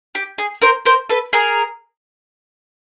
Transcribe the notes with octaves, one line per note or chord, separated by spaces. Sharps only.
G4
G#4
A#4 C5
A#4 C5
A4 B4
G#4 A#4